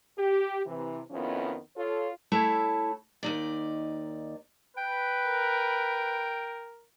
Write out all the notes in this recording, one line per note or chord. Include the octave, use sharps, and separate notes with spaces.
G4
C3 E3
F2 D#3 F3 B3 C#4 E4
F4 A4 C#5
A3 E4 C#5 A5
D#2 D#4 D5
B4 G5
A#4